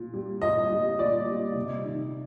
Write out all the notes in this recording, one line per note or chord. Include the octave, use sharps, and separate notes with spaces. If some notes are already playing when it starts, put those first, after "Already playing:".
Already playing: A#2
G3
A#2 D#5
G3
A#2 D5
G3
C3
D#3